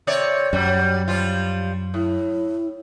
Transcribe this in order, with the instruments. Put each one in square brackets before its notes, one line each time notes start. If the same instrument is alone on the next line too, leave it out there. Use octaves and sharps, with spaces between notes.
[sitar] C3 C#5 D5
[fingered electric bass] F#2 [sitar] F#3 G3
[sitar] F3 G3 F4
[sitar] A2 [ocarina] E4